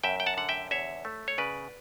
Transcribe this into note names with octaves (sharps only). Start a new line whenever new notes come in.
F#2 E5 G5
G5
F#5 A5
D3 F#5
E5 G5
E2 C#5 E5
A3
C#5
C#3 B4 D5